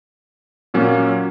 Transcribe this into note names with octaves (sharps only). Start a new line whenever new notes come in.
A#2 F#3 A#3 C#4